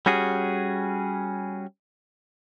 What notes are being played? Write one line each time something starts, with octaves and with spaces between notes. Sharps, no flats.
G3 C#4 F#4 G#4